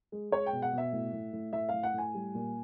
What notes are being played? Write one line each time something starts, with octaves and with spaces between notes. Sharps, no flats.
G#3
G#3 C#5
G5
B2
F#5
B2 E5
A2
A2
A2
A2 E5
A2 F5
F#5
A2 G#5
G3
A#2